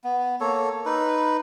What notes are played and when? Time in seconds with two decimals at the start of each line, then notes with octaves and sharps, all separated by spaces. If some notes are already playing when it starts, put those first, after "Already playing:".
0.04 B3
0.41 A#3 A4 C#5
0.85 D#4 B4